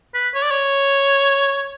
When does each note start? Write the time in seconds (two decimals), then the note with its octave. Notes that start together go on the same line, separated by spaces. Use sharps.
0.14 B4
0.35 C#5
0.43 D5
0.51 C#5